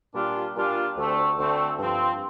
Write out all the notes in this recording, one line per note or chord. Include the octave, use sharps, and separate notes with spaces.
A#2 G3 D4 F4
A#2 G3 D4 F4
D2 D3 A3 C4
D2 D3 A3 C4
G2 F3 C4